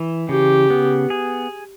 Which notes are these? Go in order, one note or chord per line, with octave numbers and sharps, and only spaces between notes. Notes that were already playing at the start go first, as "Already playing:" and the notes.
Already playing: E3
C#3 G4
B3
G#4